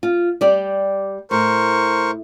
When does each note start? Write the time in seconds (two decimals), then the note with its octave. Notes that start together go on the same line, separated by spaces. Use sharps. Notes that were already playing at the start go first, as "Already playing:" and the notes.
0.03 F4
0.41 G3 G4 D5
1.31 A2 A#4 C5 C#6